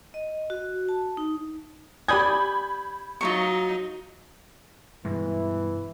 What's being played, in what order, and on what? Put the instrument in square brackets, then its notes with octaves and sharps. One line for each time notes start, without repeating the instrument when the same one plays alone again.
[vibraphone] D#5
F#4
A5
D#4
[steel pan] G4 D5 G#5 [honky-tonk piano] B5 G6 G#6 [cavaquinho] D#6
[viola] F#3 D#4 [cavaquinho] F4 A#4 C#6
[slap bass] G2 B2 G#3 [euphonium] E3